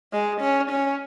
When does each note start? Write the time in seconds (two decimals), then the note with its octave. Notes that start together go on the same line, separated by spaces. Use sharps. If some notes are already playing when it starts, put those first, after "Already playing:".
0.13 G#3
0.41 C#4
0.70 C#4